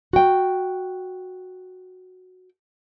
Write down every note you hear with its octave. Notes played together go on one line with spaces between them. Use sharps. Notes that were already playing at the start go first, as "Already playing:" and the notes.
F#4 G5